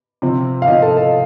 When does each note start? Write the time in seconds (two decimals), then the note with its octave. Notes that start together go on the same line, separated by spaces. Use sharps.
0.22 C3 F3 C4
0.62 F5
0.67 C3 F3 C4 D#5
0.82 A4
0.97 A4